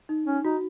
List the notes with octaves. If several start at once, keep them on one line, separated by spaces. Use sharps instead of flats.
D#4
C#4
D#4 F#4